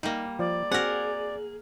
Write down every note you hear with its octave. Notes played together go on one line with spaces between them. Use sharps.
G3 A#3 D#4
F3 D5
C4 F#4 G#4 A#4 F#5